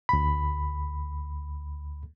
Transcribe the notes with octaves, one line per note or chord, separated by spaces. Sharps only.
D2 B5